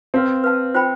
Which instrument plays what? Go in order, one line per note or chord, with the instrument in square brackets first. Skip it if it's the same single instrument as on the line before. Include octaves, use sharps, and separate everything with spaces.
[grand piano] C4 [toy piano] B4 F5 A5
[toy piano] B4 F5 A5
F4 C5 G5 B5